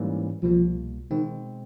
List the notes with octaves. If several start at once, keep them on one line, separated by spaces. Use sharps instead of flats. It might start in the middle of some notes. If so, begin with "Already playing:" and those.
Already playing: G#2 E3 G3 A#3 C#4
C2 B2 F3 G3 A#3
B2 D#3 G#3 C4